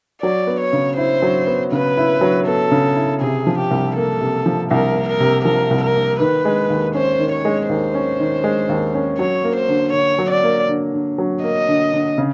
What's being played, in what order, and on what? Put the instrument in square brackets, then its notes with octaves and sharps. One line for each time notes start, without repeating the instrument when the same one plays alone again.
[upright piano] F#3 [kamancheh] D5
[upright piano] B3
[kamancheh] C#5
[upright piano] C#3
[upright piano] E4 [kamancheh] C5
[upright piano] F#3
B3
[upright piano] C#3 [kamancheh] B4
[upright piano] E4
F#3
[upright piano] B3 [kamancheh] A4
[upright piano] C#3
E4
[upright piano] C3 [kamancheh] G#4
[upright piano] F3
[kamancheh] G4
[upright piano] C2
[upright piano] A#3 [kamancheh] A4
[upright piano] C3
F3
[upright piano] C2 [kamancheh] A#4
[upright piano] A#3
[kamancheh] A#4
[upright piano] C3
[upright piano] F3 [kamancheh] A#4
[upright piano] C2
[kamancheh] A#4
[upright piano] A#3
[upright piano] D#3 [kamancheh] B4
[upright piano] G#3
D#2
[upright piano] C#4 [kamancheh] C5
[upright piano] D#3
[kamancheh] C#5
[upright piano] G#3
[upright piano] D#2 [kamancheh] C5
[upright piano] C#4
D#3
G#3
D#2
C#4
[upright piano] F#3 [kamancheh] C#5
[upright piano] A#3
[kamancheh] C5
[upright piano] D3
[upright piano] D3 [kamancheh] C#5
[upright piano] F#3
[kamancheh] D5
[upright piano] A#3
D3
D3
F#3
[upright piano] A#3 [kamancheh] D#5
[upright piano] D3
D3
C#3